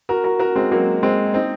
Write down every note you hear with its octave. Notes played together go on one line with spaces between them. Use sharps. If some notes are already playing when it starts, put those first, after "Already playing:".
F#4 A#4
F#4 A#4
F#4 A#4
G#3 C4
F#3 A#3
G#3 C4
C4 D#4